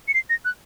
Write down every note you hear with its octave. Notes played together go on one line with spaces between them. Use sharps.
C#7
C7
A#6
F#6